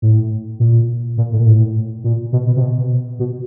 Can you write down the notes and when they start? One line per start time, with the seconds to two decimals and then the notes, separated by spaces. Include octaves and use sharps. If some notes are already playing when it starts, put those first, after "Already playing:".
0.02 A2
0.60 A#2
1.18 A#2
1.32 A2
1.40 A#2
1.46 A2
2.04 A#2
2.32 B2
2.47 B2
2.56 C3
2.61 B2
3.19 B2